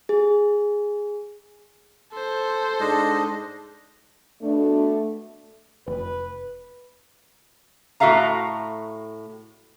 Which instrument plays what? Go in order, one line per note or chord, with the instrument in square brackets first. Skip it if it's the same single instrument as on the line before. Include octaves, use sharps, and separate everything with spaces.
[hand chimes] G#4
[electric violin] A4 C5
[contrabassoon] G#2 [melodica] D4 D#5
[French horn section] B2 D4 [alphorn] A3
[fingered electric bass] F1 [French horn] B4
[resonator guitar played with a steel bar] A2 F#4 A4 E5 F5 A#5